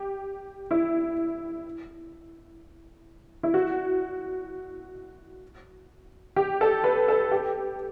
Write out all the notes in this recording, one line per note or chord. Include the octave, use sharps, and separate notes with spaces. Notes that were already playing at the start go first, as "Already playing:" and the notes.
Already playing: G4
E4
E4
F#4
G4
A4
B4
A4
G4